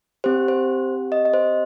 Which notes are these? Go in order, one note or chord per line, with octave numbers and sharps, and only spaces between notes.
C4 G4 C5
C5
D#5
D#5
C5